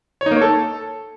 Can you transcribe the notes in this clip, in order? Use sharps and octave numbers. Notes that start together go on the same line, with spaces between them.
C#5
D#4
A#3
C#5
A4